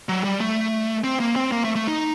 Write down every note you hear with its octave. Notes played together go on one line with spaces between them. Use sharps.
F#3
G3
A3
C4
A#3
C4
A#3
A3
A3
D#4